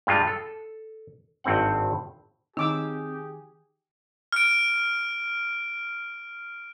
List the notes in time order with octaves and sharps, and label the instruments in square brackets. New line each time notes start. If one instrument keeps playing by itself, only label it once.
[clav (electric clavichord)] G2 G3 G#3 F4
A4
G#1 G2 C4 F#5
[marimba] D#3 [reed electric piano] C4 G#5 [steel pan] D#4 D6 E6 [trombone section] G4 G#4
[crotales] F6 D7